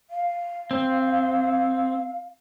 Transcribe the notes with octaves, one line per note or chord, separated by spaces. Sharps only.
F5
C4